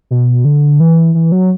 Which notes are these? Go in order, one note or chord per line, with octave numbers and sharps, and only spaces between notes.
B2
D3
E3
E3
F#3